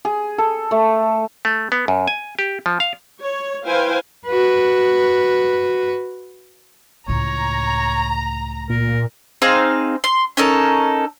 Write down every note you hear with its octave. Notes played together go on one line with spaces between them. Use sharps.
G#4
A4
A3
A3
B3
F#2
G#5
G4
F3
F5
C#5
E4 B4 C5 F5 G5 G#5
F#4 B4
C#2 A2 C#5 A#5
A#2 A#4
C4 D#4 G#4 F5
C6
C#4 D#4 A4 A#4